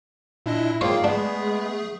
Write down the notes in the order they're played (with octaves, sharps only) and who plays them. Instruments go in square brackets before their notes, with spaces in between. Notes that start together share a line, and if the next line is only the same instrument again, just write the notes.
[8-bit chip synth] A#2 D4 D#5 [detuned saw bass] E4
[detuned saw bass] G#2 [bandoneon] A#3 F5 [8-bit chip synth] F4 G#4 G5 [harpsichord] C5 C#5
[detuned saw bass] G#3 [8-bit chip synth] A3 G#4 [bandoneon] B3 [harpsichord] D4